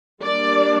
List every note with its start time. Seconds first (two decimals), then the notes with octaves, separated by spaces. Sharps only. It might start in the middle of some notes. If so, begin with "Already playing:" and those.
0.22 G3 A#3 D4 D5